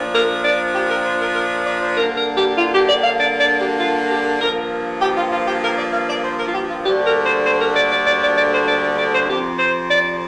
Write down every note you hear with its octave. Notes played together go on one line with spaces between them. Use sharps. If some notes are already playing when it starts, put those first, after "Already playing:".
Already playing: A#2 F3 D4
A#4
D5
G4
A#4
C5
A#4
A#4
D5
C5
G2 D3 A#3 D4 A#4
A#4
G4
F4
G4
D5
F5
D5
D5
G4
F4
G4
G2 F3 A#3 A#4
G4
F4
F4
G4
A#4
D5
F5
D5
C5
A#4
F4
G4
F4
D2 D3 G3 A#3 D4 G4
A#4
C5
C5
A#4
D5
D5
D5
D5
D5
C5
D5
D5
C5
F2 C3 F3 C4 G4
C5
D5